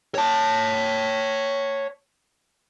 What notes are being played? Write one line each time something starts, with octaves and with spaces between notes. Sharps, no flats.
C#5 A5